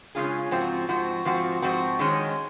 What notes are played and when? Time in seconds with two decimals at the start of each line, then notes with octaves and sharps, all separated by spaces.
0.15 C#3 G#3 C#4 F4 G#4
0.51 G#2 F3 C4 F#4
0.89 G#2 F3 C4 F#4
1.25 G#2 F3 C4 F#4
1.62 G#2 F3 C4 F#4
1.99 D#3 G#3 C#4